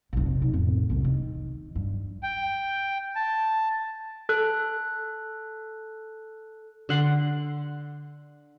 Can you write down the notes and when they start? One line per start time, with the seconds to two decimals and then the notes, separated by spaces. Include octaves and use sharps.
0.13 F1 B1
0.40 D#4 F4
0.54 F2 A2
0.90 D#1 C2
1.05 D#3
1.76 G2
2.23 G5
3.16 A5
4.29 A4 F#6
6.89 D3 F#5 C6 D6